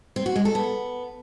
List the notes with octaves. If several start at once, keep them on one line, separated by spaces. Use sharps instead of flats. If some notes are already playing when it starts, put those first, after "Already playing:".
C4
F#4
G#3
A4
B3